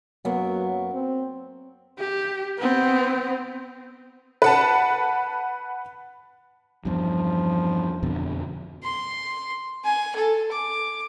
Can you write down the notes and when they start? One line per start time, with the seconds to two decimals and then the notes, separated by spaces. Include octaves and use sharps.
0.25 F#2 F#3 A#3 B3
0.94 C4
1.98 G4
2.58 B3 C4
4.42 B4 F#5 A5
6.85 E2 G2 F3
8.03 F2 B2 D3
8.84 C6
9.85 G#5
10.16 A4
10.52 D6